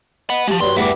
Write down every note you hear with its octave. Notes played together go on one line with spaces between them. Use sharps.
D#5 F#5 B5
F3 G#3 G4
G2 F#3 D5 C6
E2 G2 A3 E5 F#5 D6